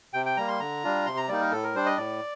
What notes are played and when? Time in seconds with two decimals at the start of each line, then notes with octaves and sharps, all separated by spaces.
0.13 C3 G5
0.26 G5
0.37 G3 A#3 A#5
0.48 C6
0.60 D3 A#5
0.84 G3 D4 F4
1.06 C3 C6
1.17 A#5
1.28 G3 A#3 D#4 D5
1.41 A#4
1.51 A2 A4
1.63 A#4
1.74 G3 D4 C5
1.86 D#5
1.97 A2 D5